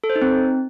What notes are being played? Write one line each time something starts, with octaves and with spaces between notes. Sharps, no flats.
A4
C5
D#4
C4